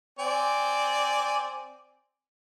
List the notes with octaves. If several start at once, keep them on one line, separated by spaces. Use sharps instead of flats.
C4 D5 G#5